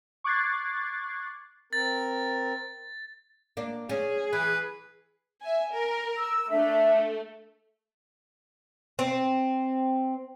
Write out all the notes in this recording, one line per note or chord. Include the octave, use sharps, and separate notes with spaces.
C#6 D6 F#6 G#6 A6 C7
C4 A#4 A6
A#3 D4
C#4 G#4
E3 B4
E5 G#5
A#4
E6
A3 D4 E5
C4